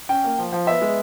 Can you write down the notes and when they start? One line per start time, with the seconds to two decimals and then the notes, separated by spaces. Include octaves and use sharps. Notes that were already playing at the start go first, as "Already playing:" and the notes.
0.09 C#4 G5
0.24 A#3
0.39 F3
0.52 F3
0.67 B3 E5
0.81 G#3